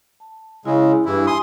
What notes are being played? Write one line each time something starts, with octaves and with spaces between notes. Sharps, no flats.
A5
C#3 G#3 E4 G#4
G2 E3 E4 G4
G#5 C6 D#6